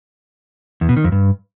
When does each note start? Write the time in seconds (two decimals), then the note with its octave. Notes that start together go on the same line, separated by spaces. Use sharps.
0.81 E2
0.89 B2
0.97 D#3
1.04 F2
1.12 G2